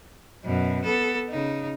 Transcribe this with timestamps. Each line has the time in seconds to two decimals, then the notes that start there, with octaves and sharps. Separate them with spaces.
0.44 F#2 B2
0.84 B3 A4
1.29 C#3 D#4